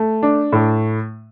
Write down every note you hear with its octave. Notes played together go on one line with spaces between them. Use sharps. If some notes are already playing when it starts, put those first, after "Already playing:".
Already playing: A3
D4
A2